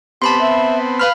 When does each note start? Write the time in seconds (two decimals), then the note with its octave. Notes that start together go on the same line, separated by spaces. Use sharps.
0.22 B3 C4 G4 A5 B5 C6
0.41 E5
1.00 B4 F5 B5 F6